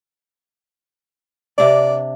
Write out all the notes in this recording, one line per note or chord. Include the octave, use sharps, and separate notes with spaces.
C3 D4 D5